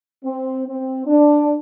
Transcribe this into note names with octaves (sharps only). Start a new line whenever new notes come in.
C4
C4
D4